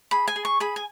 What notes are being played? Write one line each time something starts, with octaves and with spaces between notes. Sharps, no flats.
G#4 B5
G#5
G#4
C#6
G#4 B5
G#5